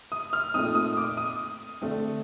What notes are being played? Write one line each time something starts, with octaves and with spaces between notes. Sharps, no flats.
D#6
F6
A#2 A3 C4 D#4 D#6
D#6
D6
D#6
D3 A3 C4